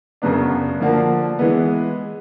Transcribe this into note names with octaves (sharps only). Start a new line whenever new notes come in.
F#2 C#3 F#3 B3 D4
D3 F3 A#3 D4 F#4
E3 G#3 B3